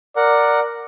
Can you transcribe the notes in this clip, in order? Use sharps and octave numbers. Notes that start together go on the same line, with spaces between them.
A#4 D5 F#5